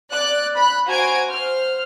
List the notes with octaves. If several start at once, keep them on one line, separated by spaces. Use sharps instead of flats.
D5 F#6
B5 F#6
F#4 C5 G#5 A#5 G#6 D7
C5 F6